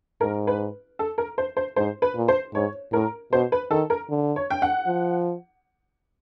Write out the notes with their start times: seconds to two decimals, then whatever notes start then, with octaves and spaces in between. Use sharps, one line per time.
0.21 G#2 A#4
0.47 B4
0.99 A4
1.18 A#4
1.38 C5
1.57 C5
1.76 G#2 C5
2.02 B4
2.15 A#2
2.28 C5
2.54 G#2 C#5
2.93 A2 A#4
3.33 B2 C5
3.52 B4
3.71 D#3 A4
3.90 A#4
4.10 D3
4.36 C#5
4.50 G5
4.62 F#5
4.87 F3